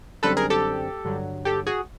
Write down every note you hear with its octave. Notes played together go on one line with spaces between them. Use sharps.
F#2 D3 G3 C4 A4 B4
G#4 A#4
G4 A4
G2 D3 F#3
G4 A4
F#4 G#4